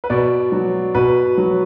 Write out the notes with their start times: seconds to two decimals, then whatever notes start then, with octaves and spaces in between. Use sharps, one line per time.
0.04 B4
0.10 B2 D5
0.52 F#3
0.95 B2 B4
1.37 F#3